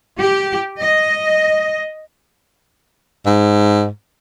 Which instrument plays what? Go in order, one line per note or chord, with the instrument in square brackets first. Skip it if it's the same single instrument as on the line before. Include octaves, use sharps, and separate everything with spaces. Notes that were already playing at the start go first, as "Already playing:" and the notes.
[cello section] G4
D#5
[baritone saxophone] G#2